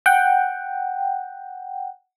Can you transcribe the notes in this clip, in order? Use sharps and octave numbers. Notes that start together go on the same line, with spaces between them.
F#5 G5